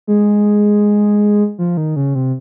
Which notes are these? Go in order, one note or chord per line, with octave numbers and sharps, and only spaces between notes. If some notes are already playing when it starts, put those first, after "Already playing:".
G#3
F3
D#3
C#3
C3